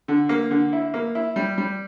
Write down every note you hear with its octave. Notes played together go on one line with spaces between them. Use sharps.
D3
A#3
D3
E4
A#3
E4
G3
G3